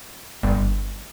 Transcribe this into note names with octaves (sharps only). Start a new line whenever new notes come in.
G1